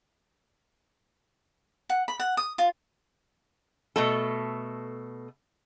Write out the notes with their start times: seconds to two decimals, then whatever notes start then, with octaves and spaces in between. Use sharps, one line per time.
1.90 F#5
2.08 B5
2.20 F#5
2.37 D#6
2.58 F4
3.96 B2 A3 A4